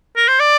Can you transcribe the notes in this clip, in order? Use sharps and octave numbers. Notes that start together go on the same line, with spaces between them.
A#4
C5
D5